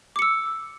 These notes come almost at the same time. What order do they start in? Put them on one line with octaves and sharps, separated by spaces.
D6 C#7 E6